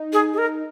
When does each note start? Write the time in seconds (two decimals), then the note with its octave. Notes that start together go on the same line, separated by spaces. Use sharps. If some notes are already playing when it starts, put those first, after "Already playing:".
Already playing: D#4
0.13 G#4
0.33 G#4
0.38 A#4